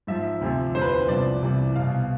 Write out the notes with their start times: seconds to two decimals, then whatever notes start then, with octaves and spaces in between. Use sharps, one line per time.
0.07 G#2 F3 E5
0.41 D2 C3 F3
0.75 E2 D3 F3 C5
0.82 B4
0.89 C5
1.08 C2 C3 F3 D5
1.42 C2 C3 E3
1.76 C2 B2 F5